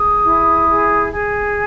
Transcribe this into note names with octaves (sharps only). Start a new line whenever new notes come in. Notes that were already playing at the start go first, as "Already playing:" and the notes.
Already playing: G#4 D#6
E4
G#4
G#4